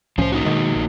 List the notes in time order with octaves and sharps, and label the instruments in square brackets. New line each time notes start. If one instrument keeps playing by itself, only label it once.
[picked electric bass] C2 A2 C#4 [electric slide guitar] F3 C5
[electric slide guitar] A#3 D#4 F#4
[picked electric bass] B2 D#3 G#3
A#1